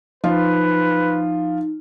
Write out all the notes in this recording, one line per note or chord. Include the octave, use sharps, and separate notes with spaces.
F3 D#4 F4 B4